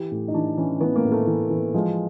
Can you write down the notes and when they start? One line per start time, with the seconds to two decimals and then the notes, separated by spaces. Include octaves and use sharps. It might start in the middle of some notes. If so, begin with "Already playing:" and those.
Already playing: E3 G4
0.11 A2
0.28 D#4
0.34 E3 D4
0.57 E3 C#4
0.81 E3 B3
0.96 A#3
1.05 A2
1.12 A3
1.27 E3
1.50 E3
1.74 F3 G#3